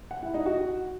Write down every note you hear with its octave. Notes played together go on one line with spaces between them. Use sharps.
F#5
E4
D#4
F#4